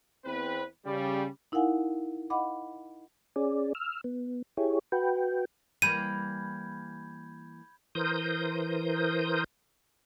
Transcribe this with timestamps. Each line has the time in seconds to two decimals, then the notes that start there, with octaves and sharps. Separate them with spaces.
0.25 E2 C4 B4
0.86 C#3 G3
1.52 D#4 E4 A#4 F5 F#5 G#5
2.30 D#5 F5 F#5 B5 D6
3.36 C#4 G#4 D5
3.75 E6 F6
4.04 B3
4.57 E4 G4 G#4 C#5
4.92 F#4 B4 G5
5.82 E3 G3 A#3 B5 G6 G#6 D#7
7.95 E3 A#4 C5 D#6 G6